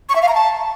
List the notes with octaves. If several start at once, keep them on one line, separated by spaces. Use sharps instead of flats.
C#6
E5
F5
A#5
A5